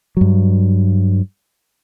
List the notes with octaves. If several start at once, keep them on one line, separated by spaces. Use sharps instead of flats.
G2 F#3